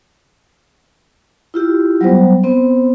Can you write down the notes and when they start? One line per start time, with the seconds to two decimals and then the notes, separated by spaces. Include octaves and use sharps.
1.54 E4 F4 G4
2.01 F#3 G3 B3 C5
2.43 B3 C4 C5